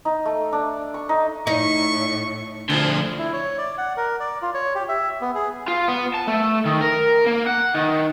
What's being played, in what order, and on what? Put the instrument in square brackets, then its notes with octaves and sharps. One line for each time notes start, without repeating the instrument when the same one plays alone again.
[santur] D#4
A3
D4
C#6
D#4
[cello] A2 [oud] D#4 [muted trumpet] C#6
[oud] D2 [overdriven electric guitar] D3 F3 [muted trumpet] G#4
[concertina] E4
C#5
D5
F#5
A#4
D5
F4
C#5
G4
E5
B3
G#4
[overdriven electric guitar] F4
B3
A5
A3
D#3
A#4
A#3
F#5
D#3